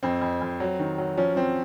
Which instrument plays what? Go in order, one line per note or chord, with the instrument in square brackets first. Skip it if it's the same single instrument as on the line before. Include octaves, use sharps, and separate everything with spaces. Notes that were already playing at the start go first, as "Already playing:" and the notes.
[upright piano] F2 C4
F2
F2
F#3
D#3
F#3
F3 C#4
F3 C4